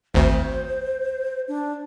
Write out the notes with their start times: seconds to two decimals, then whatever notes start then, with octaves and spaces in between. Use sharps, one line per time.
0.14 G#1 D2 C5
1.48 D4